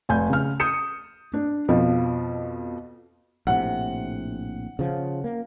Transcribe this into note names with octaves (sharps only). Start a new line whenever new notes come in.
F1 G#5 G6
C#3 F6
D#6 G6 C#7 E7
D4
F2 B2 F3
A#1 A2 C3 F#5
C#3 F3
A#3